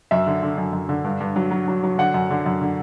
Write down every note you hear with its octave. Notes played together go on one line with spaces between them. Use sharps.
F#2 E5
D3
D3
F#2
F#2
D3
G2
G2
F#3
F#3
F#3
F#3
D3 F#5
F#2
D3
F#2
D3